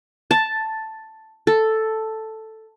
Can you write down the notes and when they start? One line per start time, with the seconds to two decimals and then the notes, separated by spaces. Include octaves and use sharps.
0.31 A5
1.47 A4